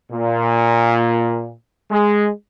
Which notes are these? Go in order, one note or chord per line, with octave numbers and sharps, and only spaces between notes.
A#2
G#3